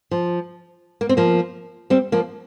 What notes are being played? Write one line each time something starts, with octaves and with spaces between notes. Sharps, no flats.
F3
A#3
C4
F3 A#3
G3 C4
F3 A#3